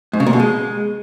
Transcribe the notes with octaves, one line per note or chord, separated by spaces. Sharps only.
G#2
C#3
A#2
B2
G#3